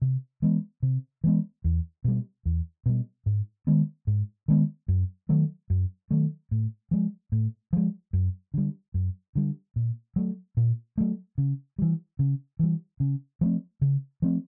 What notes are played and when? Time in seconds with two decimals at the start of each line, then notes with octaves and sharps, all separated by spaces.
0.02 C3
0.42 E3 G#3 B3
0.83 C3
1.24 E3 G#3 B3
1.64 E2
2.04 B2 G3
2.46 E2
2.86 B2 G3
3.26 G#2
3.67 D#3 G#3 B3
4.07 G#2
4.48 D#3 G#3 B3
4.88 F#2
5.29 D#3 F#3 A3
5.70 F#2
6.11 D#3 F#3 A3
6.51 A2
6.91 F3 G#3
7.32 A2
7.73 F3 G#3
8.13 F#2
8.54 D3 G3
8.94 F#2
9.35 D3 G3
9.76 A#2
10.16 F#3 A3
10.57 A#2
10.98 F#3 A3
11.38 C#3
11.79 E3 G3
12.19 C#3
12.59 E3 G3
13.00 C#3
13.41 F3 A3 C4
13.82 C#3
14.22 F3 A3 C4